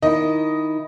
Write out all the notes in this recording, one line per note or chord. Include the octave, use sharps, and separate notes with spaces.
D#3 E4 D#5